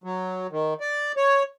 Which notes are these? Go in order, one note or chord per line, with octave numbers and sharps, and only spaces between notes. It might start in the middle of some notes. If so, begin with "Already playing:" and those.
F#3
D#3
D5
C#5